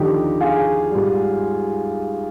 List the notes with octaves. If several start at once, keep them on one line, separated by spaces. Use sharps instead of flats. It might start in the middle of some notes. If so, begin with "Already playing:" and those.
Already playing: D#2 D3 F3 D#4 G4
F4 G#4
G#2 G3